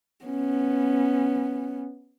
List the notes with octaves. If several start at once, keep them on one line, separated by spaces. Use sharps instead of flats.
B3 C#4